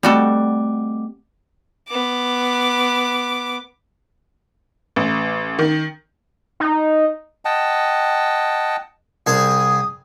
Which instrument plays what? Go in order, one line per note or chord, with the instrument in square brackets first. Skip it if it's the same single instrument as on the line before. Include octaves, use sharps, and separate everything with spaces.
[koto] G3 F#4 A4 [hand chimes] A3 C4 D6
[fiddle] B3 D6
[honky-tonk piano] A1
D#3
[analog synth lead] D#4
[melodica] D#5 F#5 G5 A5
[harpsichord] C2 G#4 A5 [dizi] D#6